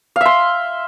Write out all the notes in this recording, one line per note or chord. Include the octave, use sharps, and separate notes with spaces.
E5 F5 C6